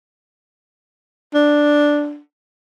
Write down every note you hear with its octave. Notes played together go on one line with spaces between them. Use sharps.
D4